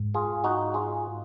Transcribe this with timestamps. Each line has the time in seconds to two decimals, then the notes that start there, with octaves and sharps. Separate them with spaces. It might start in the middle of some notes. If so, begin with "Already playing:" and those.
Already playing: G#2
0.14 F4 G#4
0.44 D#4 F#4
0.74 F4 G#4